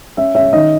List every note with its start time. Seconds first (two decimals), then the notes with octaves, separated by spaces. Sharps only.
0.17 C#4 E5
0.35 C#4 E5
0.53 D#3 D#5